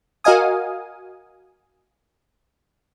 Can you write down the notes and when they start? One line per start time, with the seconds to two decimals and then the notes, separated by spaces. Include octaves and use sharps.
0.24 F#4 A#4 D#5 F5 G#5 D#6